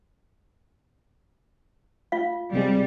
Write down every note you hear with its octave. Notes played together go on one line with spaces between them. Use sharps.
F4 F5
C2 C3 G3 G#3